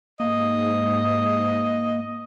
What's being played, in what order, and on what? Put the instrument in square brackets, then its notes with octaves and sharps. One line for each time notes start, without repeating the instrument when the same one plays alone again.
[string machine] G#2 [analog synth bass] A#3 [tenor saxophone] D#5